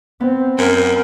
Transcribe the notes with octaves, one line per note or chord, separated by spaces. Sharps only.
B3 C4
F#2 A#4